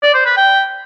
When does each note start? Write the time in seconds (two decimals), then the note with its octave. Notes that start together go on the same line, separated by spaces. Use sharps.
0.03 D5
0.14 C5
0.26 B4
0.37 G5